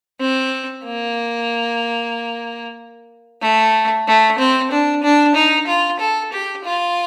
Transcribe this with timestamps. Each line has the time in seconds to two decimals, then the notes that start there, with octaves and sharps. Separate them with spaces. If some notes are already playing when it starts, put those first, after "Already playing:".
0.20 C4
0.84 A#3
3.42 A3
4.07 A3
4.39 C4
4.71 D4
5.03 D4
5.35 D#4
5.67 F4
6.00 A4
6.33 G4
6.65 F4